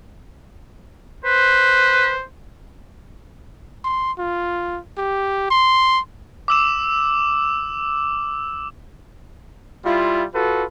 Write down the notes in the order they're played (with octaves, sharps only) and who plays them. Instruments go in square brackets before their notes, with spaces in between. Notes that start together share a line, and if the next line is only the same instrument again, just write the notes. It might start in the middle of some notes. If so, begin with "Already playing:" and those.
[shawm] B4 [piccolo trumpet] C5
[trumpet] C6
F4
G4
C6
[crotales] D6 E6 E7
[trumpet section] G3 E4 F4
F4 F#4 A4 B4